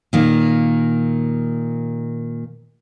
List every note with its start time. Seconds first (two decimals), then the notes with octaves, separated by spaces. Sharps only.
0.13 A#2 D#3 A#3